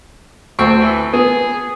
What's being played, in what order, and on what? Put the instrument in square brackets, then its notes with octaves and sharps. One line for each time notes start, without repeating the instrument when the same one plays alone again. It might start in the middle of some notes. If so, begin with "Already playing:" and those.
[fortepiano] D2 C#6 [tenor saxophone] C4
[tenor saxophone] E3
[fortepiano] B3 [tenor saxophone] G#4